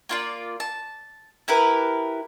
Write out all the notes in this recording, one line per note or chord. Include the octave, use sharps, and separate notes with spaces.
A#3 F4 D5
A5
E4 G4 A#4 B4